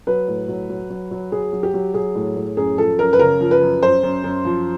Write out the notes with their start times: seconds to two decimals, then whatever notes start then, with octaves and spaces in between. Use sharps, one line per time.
0.07 F#3 B4
0.28 A2
0.48 F#3
0.70 F#3
0.90 F#3
1.11 F#3
1.32 F#3 G#4
1.53 F#3
1.63 G4
1.74 F#3
1.94 F#3 G#4
2.16 A2
2.36 A2
2.57 F#2 G#4
2.78 F3 A4
2.99 F#2 A#4
3.13 B4
3.19 C#3 A#4
3.41 F3
3.51 B4
3.61 F#2
3.82 F#2 C5
4.03 F#2
4.24 F#2
4.45 F3